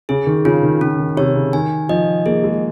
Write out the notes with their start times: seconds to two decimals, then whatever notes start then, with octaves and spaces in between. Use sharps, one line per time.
0.09 C#3 G#4
0.27 D#3
0.45 C#3 F4
0.63 D#3
0.81 C#3 C#4
0.99 D#3
1.17 C3 C#5
1.35 C#3
1.53 D#3 G#5
1.89 F3 D#5
2.26 A#3 G#4
2.44 G#3